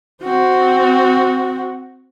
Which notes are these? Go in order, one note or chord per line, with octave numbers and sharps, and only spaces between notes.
C4 F#4